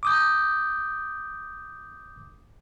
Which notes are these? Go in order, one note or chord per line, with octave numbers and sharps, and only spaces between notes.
D6 D#6 G6